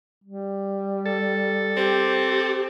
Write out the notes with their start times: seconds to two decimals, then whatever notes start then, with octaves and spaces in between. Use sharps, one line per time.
0.24 G3
1.06 A4
1.77 C4 G4